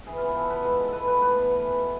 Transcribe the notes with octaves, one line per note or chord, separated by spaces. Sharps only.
E3 G#4
B3 F4
F4
B3 A4
B3 B4
G#3 A4
G#3
B3 A4 B4
B3 B4
A2 B4
B3
B3
E3
B2